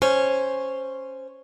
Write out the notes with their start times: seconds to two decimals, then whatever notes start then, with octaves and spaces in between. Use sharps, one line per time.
0.02 C#4 C5